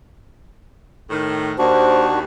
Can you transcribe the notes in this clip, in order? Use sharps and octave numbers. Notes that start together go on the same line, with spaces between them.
A2 D#3
D#2 D4 F#4 C5